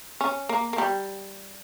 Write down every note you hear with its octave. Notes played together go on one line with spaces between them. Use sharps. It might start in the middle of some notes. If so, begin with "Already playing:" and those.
C#4
A#3
A#3
G3